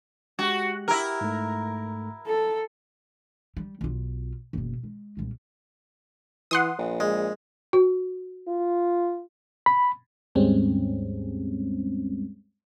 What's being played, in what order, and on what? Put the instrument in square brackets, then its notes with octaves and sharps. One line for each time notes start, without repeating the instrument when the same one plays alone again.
[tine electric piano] G#3 G4 [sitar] F#4
[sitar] E4 A#4 [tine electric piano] G4
[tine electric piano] G#2 A3
[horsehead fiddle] A4
[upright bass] G3
B1 F4
F#1 B2
G#3
C2 A#2
[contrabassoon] E3 [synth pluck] F#5 C6 D#6
[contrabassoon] A#1
[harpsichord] G#3
[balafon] F#4
[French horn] F4
[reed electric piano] B5
[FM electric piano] D#2 G#2 G3 G#3 C4 C#4